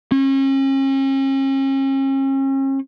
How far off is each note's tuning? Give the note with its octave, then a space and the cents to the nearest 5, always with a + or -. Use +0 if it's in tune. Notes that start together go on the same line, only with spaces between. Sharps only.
C#4 -40